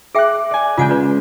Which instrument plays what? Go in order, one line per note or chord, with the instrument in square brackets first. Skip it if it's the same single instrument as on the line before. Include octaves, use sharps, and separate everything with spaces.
[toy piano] G#4 E5 G5 [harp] D6 F#6
[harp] D5 G#5
[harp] C#3 G#3 G6 [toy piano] F4 F#5 G#5
[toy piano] F4 B4 D5